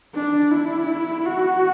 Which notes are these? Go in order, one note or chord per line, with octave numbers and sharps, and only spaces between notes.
D4
E4
F#4